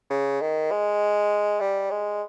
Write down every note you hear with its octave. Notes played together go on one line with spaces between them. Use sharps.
C#3
D#3
G#3
G3
G#3